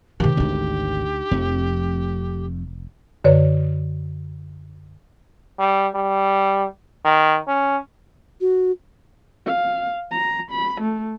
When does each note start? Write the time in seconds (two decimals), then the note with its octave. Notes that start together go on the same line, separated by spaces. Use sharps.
0.20 C3 D#3 G4
0.37 G#1 D2 D4 D#4
1.31 F1 F2 A3 C4
3.24 F#2 D3 B4 C#5
5.59 G3
5.95 G3
7.05 D#3
7.47 C#4
8.41 F#4
9.46 F5
10.11 A#5
10.51 B5
10.81 A3